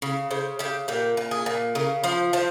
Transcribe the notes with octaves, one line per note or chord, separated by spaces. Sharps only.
C#3
C#3 C5
C#3 G4
A#2 G4
A#2
G#4
A#2
C#3 A#4
F3 C5
F3 C5